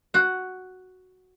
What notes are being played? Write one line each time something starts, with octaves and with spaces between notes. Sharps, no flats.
F#4 F#5